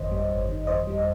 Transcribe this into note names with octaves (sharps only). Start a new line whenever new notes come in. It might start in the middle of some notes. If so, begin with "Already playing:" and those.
Already playing: G1 F2 D#3 G3 C5 C#5 D#5
G3
G1
D#3
F2 C5 D#5
G3